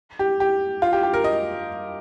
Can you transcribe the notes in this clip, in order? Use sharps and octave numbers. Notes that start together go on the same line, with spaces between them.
G4
G4
F4
G4
G4
A#4
D#5